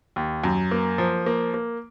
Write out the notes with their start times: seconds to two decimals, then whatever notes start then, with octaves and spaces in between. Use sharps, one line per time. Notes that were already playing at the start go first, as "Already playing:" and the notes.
0.16 D#2
0.44 F#2
0.71 A#3
0.98 F3
1.26 A#3
1.54 A#3